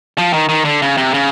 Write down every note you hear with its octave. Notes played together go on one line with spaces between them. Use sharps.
F3
D#3
D#3
D3
C#3
C3
C#3